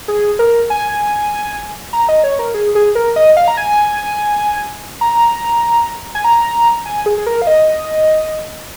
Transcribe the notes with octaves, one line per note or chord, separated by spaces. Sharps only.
G#4
A#4
G#5
A#5
D#5
C#5
A#4
G#4
G#4
A#4
D#5
F5
A#5
G#5
A#5
G#5
A#5
G#5
G#4
G#4
A#4
F5
D#5